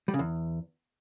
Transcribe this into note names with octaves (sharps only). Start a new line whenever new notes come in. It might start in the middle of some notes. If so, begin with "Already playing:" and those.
G3
C#3
E2